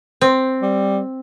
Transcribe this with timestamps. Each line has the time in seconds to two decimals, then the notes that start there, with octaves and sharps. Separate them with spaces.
0.21 C4
0.62 G3